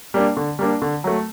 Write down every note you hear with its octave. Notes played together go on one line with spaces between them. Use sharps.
G3 A#3 D4
D3
G3 A#3 D4
D3
F#3 A3